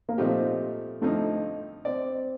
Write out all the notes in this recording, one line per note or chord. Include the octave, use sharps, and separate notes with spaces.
A#3
A#2 F3 A3 C4 D#4 G4
F2 D3 F3 A3 C4 D#4
C4 D5